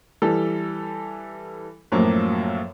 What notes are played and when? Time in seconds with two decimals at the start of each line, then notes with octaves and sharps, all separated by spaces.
0.22 E3 G3 A4
1.92 F#2 A2 F3 F#3 A#3